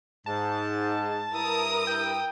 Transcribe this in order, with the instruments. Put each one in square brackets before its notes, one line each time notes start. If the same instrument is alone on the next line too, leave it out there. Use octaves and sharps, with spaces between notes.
[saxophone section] G#2 [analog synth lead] A5
[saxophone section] G2 E4 [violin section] A#4 D#6
[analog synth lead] G5